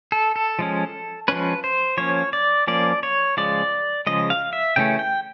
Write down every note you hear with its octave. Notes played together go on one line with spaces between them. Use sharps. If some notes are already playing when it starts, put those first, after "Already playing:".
A4
A4
F3 G#3 C#4
F3 G#3 C#4 B4
C5
F3 A#3 C#4 C#5
D5
F3 A#3 C#4 D5
C#5
C#3 F3 G#3 D5
C#3 F3 G#3 D#5
F5
E5
C#3 E3 A3 C#4 G5
G5